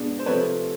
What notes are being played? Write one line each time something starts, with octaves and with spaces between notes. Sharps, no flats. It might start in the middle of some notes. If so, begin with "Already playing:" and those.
Already playing: B2 G#3 B3 D4
C5
C3 F3 A3 B4 C#5